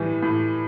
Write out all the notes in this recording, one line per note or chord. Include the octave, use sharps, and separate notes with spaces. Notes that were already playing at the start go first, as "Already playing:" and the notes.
Already playing: A2 E3 G3
A2